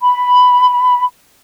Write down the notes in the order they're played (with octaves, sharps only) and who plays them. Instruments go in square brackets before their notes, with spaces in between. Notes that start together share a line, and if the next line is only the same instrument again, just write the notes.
[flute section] B5